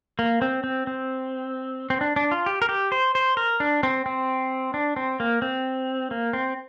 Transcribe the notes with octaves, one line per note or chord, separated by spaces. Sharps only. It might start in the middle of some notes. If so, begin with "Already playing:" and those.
A#3
C4
C4
C4
C4
D4
D4
F4
G4
A#4
G4
C5
C5
A#4
D4
C4
C4
D4
C4
A#3
C4
A#3
C4